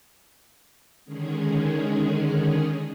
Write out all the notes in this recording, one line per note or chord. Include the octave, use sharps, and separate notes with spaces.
D3 D#3 G#3 C#4 G#4